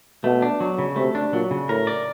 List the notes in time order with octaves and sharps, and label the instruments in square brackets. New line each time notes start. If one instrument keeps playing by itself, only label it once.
[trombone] B2 [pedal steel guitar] A3
[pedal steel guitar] D4
F#3
C#3
[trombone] C3 [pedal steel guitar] A3
[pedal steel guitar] D4
[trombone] A#2 [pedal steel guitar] F#3
[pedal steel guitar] C#3
[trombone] A2 [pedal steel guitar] A#4
[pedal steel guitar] D5